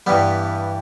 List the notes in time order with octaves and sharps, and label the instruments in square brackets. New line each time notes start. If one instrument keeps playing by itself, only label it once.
[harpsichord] G2 E3 G3 B3